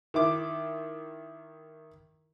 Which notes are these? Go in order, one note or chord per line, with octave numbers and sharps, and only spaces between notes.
D#3 E4 D6